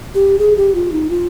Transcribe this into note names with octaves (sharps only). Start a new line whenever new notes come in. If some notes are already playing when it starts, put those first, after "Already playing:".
G4
G#4
G4
F4
D#4
F4